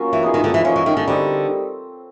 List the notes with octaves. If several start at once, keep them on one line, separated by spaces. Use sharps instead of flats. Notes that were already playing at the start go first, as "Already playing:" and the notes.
Already playing: F#3 A#3 C#4 F4 A#4
E3
B3 D#4 G#4
D#3
D3
E3
F3 C#4 F#4 A#4 D#5
E3
D#3
D3
D3 G3 C4 D#4 G4